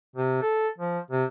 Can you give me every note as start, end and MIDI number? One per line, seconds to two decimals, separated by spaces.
0.16 0.40 48
0.42 0.68 69
0.78 0.99 53
1.11 1.25 48